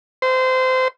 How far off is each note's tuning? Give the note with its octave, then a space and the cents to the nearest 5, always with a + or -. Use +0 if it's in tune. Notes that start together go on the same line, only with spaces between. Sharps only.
C5 -25